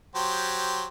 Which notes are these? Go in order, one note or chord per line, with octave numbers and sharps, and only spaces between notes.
F#3 G4 C5